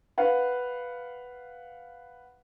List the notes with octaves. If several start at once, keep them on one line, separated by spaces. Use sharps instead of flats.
B4 F5 F#5